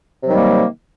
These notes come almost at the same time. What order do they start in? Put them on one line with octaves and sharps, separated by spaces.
C3 F#3 D#3 G3 A#3